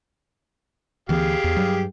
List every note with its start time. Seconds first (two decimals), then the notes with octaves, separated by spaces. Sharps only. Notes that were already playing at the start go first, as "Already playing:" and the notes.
1.09 D2 E3 B3 G4 G#4 F5
1.44 E2
1.57 G2 F#3